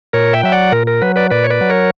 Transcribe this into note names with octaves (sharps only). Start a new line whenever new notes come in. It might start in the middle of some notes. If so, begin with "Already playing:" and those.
A#2 A#4 C#5
E5 G5
F#3 E5
D5 F#5
A#2 A#4
A#4
F#3 B4
B4 D5
A#2 B4 D5
C#5
B4 D5
F#3
A#4 C#5